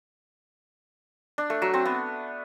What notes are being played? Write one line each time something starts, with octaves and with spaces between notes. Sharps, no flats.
D4
A3
F#3
C4
B3